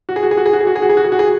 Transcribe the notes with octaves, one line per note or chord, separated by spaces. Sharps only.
F#4
G#4
F#4
G#4
F#4
G#4
F#4
G#4
F#4
G#4
F#4
G#4
F#4
G#4
F#4
G#4